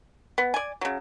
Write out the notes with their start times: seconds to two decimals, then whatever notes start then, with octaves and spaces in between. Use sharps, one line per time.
0.38 B3
0.54 D5 G#5
0.81 C#3 F#3